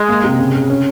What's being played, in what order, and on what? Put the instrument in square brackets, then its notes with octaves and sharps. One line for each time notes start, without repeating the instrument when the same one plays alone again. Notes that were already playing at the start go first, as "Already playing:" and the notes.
Already playing: [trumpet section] G#3
[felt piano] A#3
C3
C#3
C#3
C#4